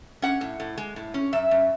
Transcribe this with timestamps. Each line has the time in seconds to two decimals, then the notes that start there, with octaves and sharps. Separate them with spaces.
0.22 C#4 F#5
0.41 A2
0.60 A2
0.78 G#3
0.96 A2
1.14 C#4
1.33 F#2 E5
1.51 F#2